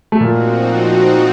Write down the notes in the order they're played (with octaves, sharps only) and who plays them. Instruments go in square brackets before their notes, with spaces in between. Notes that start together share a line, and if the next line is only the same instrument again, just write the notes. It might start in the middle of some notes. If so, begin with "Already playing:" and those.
[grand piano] A3
[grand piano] A#2 A#3 [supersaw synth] F3 C4 D#4 F#4